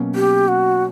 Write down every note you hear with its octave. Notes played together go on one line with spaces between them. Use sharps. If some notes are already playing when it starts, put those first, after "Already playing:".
Already playing: B2 F#3 A#3 C#4
G4
F#4